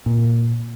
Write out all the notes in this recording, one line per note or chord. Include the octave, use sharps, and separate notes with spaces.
A#2